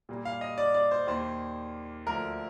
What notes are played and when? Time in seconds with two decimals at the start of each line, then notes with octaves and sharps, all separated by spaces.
0.09 A#2 G3 A#3
0.25 F5
0.41 D#5
0.58 D5
0.74 D5
0.91 C5
1.07 D#2 D#3 A#3 C5
2.06 D2 D3 F3 A3 A#4